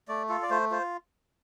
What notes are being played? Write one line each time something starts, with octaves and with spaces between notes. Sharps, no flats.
A3 D5
F4 A4
D5
A3 C5
F4 C5